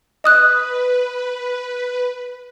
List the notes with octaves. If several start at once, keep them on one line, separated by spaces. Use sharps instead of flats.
B4 D#5 D#6 F#6